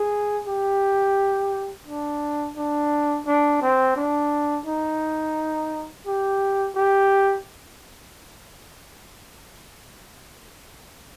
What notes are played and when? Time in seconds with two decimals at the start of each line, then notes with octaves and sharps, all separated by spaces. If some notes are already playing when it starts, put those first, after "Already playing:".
Already playing: G#4
0.47 G4
1.87 D4
2.57 D4
3.26 D4
3.62 C4
3.96 D4
4.66 D#4
6.06 G4
6.75 G4